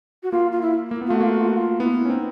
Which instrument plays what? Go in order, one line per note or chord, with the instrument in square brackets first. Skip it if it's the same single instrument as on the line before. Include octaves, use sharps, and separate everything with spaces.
[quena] F#4
[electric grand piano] A#3 [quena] F4
[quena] F4
E4
[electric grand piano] A#3
B3
[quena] F4
[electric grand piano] A3
[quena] F#4
[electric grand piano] A#3 [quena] F4
[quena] F#4
F4
F#4
F4
[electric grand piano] B3 [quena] E4
[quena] E4
[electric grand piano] C#4
[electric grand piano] C4 [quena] D#4